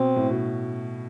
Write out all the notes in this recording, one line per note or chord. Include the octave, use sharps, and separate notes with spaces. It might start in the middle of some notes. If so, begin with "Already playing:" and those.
Already playing: B2 C4
A2
B2